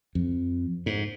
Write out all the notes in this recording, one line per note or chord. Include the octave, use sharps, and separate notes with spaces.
F2
G#2